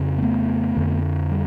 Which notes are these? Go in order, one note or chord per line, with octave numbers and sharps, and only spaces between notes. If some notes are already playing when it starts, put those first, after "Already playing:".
Already playing: F2 C#3
A#3
A3 B3
F2 D3
G3